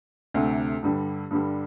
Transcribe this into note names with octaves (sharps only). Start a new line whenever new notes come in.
D2 C3 A3
G2 D3 G3
G2 D3 G3